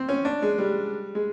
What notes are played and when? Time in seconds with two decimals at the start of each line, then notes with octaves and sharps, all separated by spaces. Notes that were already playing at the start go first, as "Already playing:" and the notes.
Already playing: C4
0.09 C#4
0.25 D4
0.42 G#3
0.58 G3
1.15 G#3